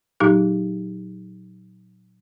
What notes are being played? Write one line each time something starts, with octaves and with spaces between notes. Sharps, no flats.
A#2 F#3 D#4 G4